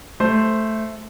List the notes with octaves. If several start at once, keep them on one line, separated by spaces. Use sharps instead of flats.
A3 C5